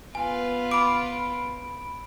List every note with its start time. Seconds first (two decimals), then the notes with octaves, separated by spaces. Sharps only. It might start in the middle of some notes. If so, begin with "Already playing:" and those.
0.15 B3 F4 B4 G#5
0.71 B5 D6 D7